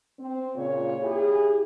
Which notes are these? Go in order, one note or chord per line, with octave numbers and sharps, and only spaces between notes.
C4
A#2 C#3 F4 C#5
E4 G4 G#4